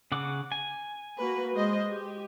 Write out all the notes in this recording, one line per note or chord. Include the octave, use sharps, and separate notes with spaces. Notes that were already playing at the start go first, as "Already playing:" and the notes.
C#3 F#5 D6
G#5
A#3 F#4 B4
G#3 C5 D#5
G4